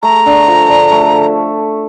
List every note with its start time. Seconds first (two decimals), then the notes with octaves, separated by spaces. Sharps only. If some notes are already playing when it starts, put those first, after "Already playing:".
0.03 A3 A#5
0.26 D3
0.48 F3
0.69 D3
0.91 A3